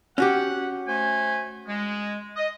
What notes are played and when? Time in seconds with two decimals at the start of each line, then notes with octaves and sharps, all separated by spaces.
0.18 C#4 F#4 G4 F#5
0.88 A3 C5 G#5
1.68 G#3
2.37 D#5